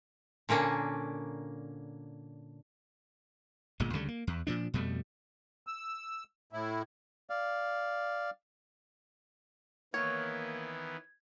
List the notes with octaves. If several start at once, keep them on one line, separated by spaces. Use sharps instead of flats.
A#2 D3 A#3 C#4 D4
G1 A#2 G#3
D2 C#3 G3 A3
A#3
E2
A#2 F3 D4
F2 B2 G3 A3
E6
A2 E4
D5 F5
D#3 E3 A#3 B3 C#5 G#6